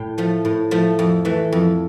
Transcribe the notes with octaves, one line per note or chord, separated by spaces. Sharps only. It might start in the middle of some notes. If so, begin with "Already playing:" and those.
Already playing: A2 G5
F3 A3
A2
F3 A3
F2
E3 A3
F2